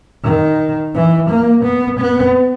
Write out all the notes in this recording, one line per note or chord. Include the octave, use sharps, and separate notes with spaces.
D#3
E3
A#3
B3
B3